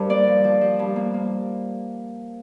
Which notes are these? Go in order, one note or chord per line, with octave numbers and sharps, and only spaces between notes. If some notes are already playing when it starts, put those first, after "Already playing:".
Already playing: G2 A#4 C5
A#3 D5
F3
F3
F3
G2
A#3
A#3